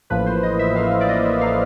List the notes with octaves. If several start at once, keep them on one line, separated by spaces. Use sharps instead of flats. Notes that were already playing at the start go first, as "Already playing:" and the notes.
A1 A2 F3 A#3 B4
C5
D#5
E5
A1 A2 F3 A#3 F5
D5
D#5
E5
A2 F3 A#3 F5